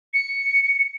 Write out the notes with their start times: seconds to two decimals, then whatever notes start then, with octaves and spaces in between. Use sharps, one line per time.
0.14 C#7